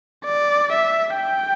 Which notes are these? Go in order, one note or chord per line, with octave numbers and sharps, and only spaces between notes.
D5
E5
G5